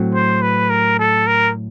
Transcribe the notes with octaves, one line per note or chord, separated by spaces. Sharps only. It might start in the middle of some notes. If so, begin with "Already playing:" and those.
Already playing: A2 F#3 A3 C4
C5
B4
A#4
A4
A#4